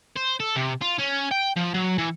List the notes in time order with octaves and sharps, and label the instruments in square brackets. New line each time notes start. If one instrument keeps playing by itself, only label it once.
[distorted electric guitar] C5
A4
C3
F4
C#4
G5
F3
F#3
E3